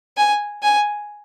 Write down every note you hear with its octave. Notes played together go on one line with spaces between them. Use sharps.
G#5
G#5